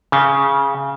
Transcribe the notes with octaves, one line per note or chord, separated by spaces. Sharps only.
C#3